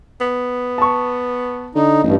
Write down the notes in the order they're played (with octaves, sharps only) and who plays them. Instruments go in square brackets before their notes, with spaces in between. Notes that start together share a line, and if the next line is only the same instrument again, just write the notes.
[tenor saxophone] B3
[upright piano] A5 C#6
[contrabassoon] D3 [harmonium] D#4
[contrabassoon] A1 [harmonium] G2 [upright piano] D#4